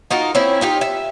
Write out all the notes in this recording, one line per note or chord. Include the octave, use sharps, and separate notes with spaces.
D#4 F4 F#4 A#4
C4 C#4 E4
D#4 F4 G4
E5